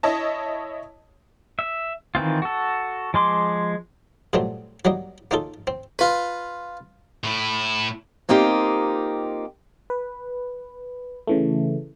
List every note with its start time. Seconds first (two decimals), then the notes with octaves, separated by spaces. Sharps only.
0.03 E4 C#5 D#5 A5
1.59 E5
2.15 D#3 E3 C4 F4
2.42 F#4 A4
3.14 F3 G#3 C6 D6
4.33 A#2 F#3 G3 A3 C4
4.85 F#3 G3 A#3 D#5
5.31 A#3 C#4 D#4 F4 A4
5.67 C4
5.99 F4 B4
7.24 A2 E4
8.29 A#3 C4 D#4 F4 G4
9.90 B4
11.27 C#3 E3 A3